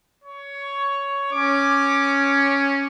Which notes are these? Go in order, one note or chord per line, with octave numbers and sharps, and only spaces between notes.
C#5
C#4 D6